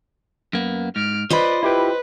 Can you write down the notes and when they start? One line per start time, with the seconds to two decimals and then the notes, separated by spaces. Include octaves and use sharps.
0.53 F#2 A#3 B3
0.96 G#2 F6 D7
1.30 F4 B4 C5 D5 D#5 B5
1.63 E4 G4 B4 G5